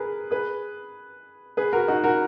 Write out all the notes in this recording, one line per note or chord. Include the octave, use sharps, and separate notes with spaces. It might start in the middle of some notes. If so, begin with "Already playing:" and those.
Already playing: G#4 A#4 B4
G#4 B4
G#4 B4
F#4 A#4
D#4 F#4
F#4 A#4